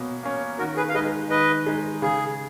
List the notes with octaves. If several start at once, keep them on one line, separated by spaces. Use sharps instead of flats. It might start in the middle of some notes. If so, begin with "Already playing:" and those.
Already playing: B2 A#3 C#4
A#3 C#4
D#3 F#4 A#4
G#4 B4
F5
G#3 D#4 B4 D#5
D#3 B4 D#5
G#3 D#4
C#3 G#4